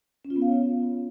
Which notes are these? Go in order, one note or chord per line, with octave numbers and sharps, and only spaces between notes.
C#4
F4
B3
F5
C#5